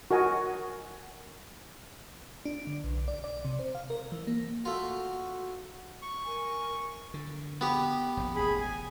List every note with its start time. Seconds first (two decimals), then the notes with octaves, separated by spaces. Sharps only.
0.11 F#4 A#4 D#5 G#5
2.45 D4
2.67 D3
2.84 B1
3.08 D5
3.24 D5
3.45 C3
3.59 C5
3.75 F5
3.90 A#4
4.12 E3
4.27 A#3
4.65 A3 F4 F#4
6.02 C#6
6.23 A#4 G#5
7.14 D3
7.61 B3 G4
8.17 E1 A#1
8.35 E1 A1 G#4 B5
8.61 G#5